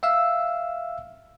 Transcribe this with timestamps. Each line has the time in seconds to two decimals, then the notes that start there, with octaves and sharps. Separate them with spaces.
0.03 E5 F5 E6